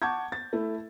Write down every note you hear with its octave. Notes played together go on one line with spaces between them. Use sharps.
F#5 A5 C#6 D6 G6 G#6
A6
A3 E4